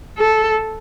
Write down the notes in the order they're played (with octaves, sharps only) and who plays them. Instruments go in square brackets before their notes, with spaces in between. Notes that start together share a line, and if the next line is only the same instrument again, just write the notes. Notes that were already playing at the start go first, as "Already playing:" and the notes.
[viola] A4